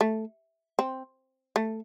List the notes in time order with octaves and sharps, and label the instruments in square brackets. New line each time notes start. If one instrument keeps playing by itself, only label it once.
[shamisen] A3
C4
A3